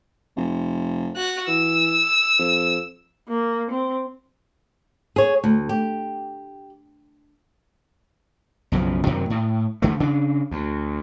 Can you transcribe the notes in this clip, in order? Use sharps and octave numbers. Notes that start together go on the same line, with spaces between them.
F1
F#4 F#6
E3 E6
F2
A#3
C4
G#4 C#5
D2
G4
B1 F#2 C#3 F3
F#2 C3 D#3 F#3
A2
D2 D3 A3
C#3 D4
D2